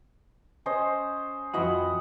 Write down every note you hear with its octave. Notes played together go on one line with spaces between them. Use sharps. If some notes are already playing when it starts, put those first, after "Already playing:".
C#4 C5 D#5
F2 E4 F#4 D#5 C#6